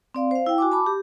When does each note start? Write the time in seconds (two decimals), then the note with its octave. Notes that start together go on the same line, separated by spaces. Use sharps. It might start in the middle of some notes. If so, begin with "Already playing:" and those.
0.15 C4 D5 F5
0.31 C5 F5
0.46 E4 G5
0.58 F#4 G#5 D6
0.72 A5 B5 D6
0.86 G4